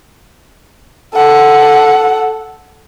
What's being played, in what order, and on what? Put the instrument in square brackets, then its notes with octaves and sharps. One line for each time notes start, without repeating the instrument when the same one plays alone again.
[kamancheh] A4 F#5